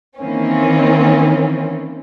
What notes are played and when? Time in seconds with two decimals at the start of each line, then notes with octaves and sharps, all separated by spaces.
0.18 D#3 E3 A#3 C4 C#4